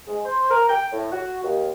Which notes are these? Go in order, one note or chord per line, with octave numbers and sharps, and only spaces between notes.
G#3
C5
A#4
G5
A2
F#4
D#2